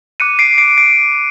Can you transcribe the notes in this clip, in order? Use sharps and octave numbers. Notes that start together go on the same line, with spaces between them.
D6 F#6 C#7 D#7
C7 D7
C7 D7
C7 D7